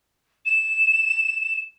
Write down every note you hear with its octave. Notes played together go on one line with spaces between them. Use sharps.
E7